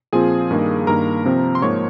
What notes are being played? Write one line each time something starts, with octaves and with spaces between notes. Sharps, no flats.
A#2 F3 C4 F4 G#4 G#5
G2 D#3 A#3 D#4
G2 D#3 A#3 A#4 A#5
C3 F3 C4
C6
G#2 F3 A#3 C#5 C#6